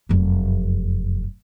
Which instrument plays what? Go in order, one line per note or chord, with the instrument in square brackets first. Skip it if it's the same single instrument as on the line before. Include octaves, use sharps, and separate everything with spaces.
[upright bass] F1 F#2